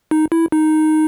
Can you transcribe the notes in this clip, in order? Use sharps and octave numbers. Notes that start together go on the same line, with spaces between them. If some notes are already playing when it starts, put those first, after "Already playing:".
D#4
E4
D#4